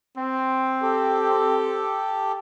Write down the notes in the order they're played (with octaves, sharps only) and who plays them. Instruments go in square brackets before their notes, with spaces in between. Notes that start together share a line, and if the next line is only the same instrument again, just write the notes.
[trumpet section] C4
[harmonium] G4 A4